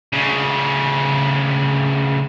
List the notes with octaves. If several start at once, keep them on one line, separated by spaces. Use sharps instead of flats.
D2 C#3